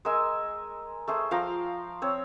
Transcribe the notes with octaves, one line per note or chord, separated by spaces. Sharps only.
G#3 A#4 G#5 E6
A3 G#4 C5
F3 F5 G5 A#5
C4 C#5